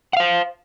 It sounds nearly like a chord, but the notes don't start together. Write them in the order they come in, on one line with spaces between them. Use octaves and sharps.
F#5 F5 C5